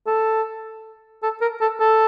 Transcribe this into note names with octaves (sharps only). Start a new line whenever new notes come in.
A4
A4
A#4
A4
A4